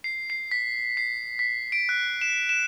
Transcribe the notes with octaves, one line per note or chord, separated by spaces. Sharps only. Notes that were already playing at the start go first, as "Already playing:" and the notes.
C7
C7
B6
C7
B6
D7
F#6
E7
E7